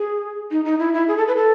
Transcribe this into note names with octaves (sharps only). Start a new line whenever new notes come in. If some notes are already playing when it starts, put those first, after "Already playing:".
Already playing: G#4
D#4
D#4
E4
E4
G#4
A4
B4
A4